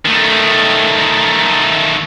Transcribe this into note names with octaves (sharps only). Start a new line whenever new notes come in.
D#3 A3